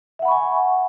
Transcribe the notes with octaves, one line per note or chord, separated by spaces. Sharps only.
E5 F#5 G#5 B5 C#6